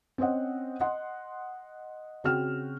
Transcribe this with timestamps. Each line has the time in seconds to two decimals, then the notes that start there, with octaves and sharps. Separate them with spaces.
0.18 C4 C#4 C5 D#5 F#5
0.81 D#5 F#5 C6
2.24 C#3 C4 F#4 G5 F6 E7